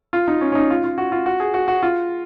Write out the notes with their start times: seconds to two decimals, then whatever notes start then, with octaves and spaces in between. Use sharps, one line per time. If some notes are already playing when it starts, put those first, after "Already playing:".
0.13 F4
0.28 D#4
0.41 C#4
0.52 C#4
0.55 D#4
0.70 F4
0.84 F4
0.98 F#4
1.12 F4
1.26 F#4
1.40 G#4
1.54 F#4
1.68 F#4
1.83 F4